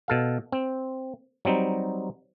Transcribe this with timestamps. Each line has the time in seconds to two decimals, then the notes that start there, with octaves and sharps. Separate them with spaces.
0.08 B2 A4 F5
0.52 C4
1.45 F#3 G3 C4 D#4